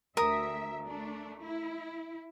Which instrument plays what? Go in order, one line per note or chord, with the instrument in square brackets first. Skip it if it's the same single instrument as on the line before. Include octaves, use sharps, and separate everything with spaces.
[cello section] D2 E5 [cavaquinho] A#4 D#6
[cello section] A3 D4
E4